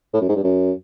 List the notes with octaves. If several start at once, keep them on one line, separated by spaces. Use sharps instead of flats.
A2
F#2
G#2
G2
F#2